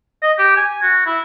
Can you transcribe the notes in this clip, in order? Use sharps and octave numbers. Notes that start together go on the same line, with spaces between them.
D#5
G4
G#5
F#4
E4